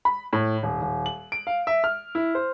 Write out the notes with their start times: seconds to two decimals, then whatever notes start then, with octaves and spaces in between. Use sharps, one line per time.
0.05 B5
0.33 A2
0.63 D#1
0.81 D#1
1.06 F#7
1.32 D7
1.47 F5
1.67 E5
1.84 F6
2.15 E4
2.35 C5